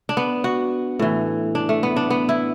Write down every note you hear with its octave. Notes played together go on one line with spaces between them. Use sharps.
D4
B3
F#4
A2 E3
D4
A3
B3
D4
B3
E4